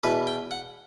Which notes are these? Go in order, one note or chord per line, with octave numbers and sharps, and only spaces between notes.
E2 B2 B4
G5
F#5